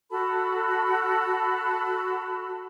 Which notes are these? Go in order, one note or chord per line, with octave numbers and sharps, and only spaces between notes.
F#4 A4 A5 B5